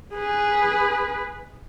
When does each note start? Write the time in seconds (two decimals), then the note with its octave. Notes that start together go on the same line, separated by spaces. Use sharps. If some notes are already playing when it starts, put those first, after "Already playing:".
0.14 G#4 B4